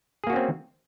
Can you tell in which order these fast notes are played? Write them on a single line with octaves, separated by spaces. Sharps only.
G#4 A#3 F#4 C#4 C4